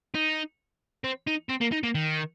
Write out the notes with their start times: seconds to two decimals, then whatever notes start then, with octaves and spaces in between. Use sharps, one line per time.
0.14 D#4
1.04 C4
1.27 D#4
1.49 C4
1.61 A#3
1.72 D#4
1.83 A#3
1.95 D#3